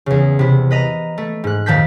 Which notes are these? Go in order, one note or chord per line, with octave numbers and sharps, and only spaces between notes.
E2 C#3
C3 E4
B4 D#5 A#5
A3
G#2 F#6
F2 A#2 D#3 A5 G6 B6